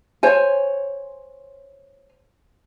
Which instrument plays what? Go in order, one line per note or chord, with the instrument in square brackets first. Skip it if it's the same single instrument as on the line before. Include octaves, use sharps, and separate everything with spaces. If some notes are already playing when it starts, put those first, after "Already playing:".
[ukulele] C5 C#5 G#5